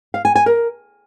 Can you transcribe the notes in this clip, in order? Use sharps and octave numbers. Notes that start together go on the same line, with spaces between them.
F5
G#5
G#5
A#4